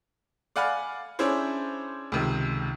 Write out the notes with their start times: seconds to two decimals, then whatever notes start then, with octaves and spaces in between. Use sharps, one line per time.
0.56 D5 F5 F#5 G#5 B5 F6
1.19 C#4 D4 E4 G#4 C5 C#5
2.12 C#2 C3 D#3